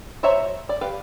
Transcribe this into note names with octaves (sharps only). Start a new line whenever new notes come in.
F#4 C5 C#5 E5 A#5
D5
G4 B4 F5